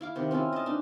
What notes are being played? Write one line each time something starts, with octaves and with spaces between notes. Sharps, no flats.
E4 F5 D6
C3 D#3
C4 C#4 E4 F4
D#5 A5
D4 D#4